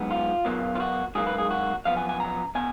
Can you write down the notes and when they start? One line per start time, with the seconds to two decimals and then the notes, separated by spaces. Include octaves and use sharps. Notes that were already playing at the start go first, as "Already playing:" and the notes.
Already playing: G#2 F#3 B3
0.11 F4
0.45 B2 F#3 A#3
0.75 F4
0.80 F#4
1.15 G#2 F#3 A#3 G#4
1.27 B4
1.38 G#4
1.51 F#4
1.85 F#2 F3 B3 F5
1.97 G#5
2.09 G#5
2.20 A#5
2.55 B2 G#5